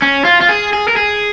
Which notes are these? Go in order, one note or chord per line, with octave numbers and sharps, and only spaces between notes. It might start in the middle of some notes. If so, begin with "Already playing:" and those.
C#4
F4
F4
G#4
G#4
A#4
G#4